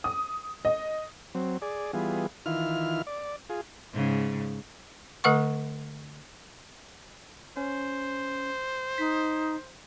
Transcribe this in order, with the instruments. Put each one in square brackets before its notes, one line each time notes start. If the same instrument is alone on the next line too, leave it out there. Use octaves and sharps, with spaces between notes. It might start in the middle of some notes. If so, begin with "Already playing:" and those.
[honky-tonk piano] D#6
D#5
[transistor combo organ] F#3 C4
G#4 D5
E3 G3 B3 F4 G#4
D#3 E3 E4 F4 F6
D5
F4 G#4
[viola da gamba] G#2 C#3
[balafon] D3 A3 B4 F#5 C#6
[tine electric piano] C#4 [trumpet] C5
[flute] D#4 [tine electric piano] B6